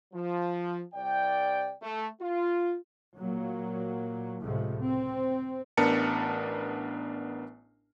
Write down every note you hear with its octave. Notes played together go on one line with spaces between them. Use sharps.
F3
C2 D5 G5
A3
F4
A#2 F#3 A#3
C#2 A2 C3 F3 G#3
C4
A1 B3 D4 A#4 A5 C#7